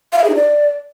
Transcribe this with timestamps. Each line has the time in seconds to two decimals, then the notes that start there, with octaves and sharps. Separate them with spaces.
0.13 F5
0.18 E5
0.24 G#4
0.30 D#4
0.35 D5